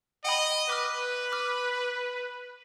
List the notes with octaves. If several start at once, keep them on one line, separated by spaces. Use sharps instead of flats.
D#5 F#5 G5 B5
B4 D6 F6
D6 F6